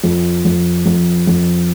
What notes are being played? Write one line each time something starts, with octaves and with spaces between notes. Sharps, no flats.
F2
F2
F2
F2